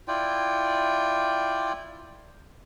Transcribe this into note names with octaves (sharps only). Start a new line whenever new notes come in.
E4 F4 D5 G5